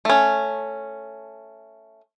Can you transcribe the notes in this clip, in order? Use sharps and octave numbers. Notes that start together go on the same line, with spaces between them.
A3 C#4